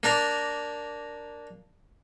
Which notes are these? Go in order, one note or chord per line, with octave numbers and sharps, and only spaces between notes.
A#3 D4 A#4